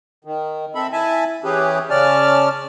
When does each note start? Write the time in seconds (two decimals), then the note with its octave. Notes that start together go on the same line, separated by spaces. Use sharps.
0.25 D#3
0.75 C4 A4 E5 B5
0.92 E4 E5 G#5 A5
1.44 E3 C#4 G4 G#4 B4
1.90 C#3 C#4 D5 A5 F6